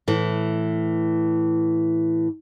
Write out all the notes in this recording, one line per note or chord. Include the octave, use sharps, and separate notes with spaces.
A2 E3